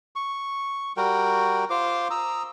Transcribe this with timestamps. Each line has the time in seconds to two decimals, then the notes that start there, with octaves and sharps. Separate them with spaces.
0.16 C#6
0.97 G3 F#4 A#4 G5
1.70 F4 C5 C6 D6
2.10 A#5 D#6 E6